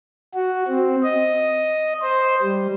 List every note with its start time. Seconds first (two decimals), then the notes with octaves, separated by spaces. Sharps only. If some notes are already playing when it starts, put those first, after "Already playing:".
0.34 F#4
0.68 C4
1.03 D#5
2.02 C5
2.42 G3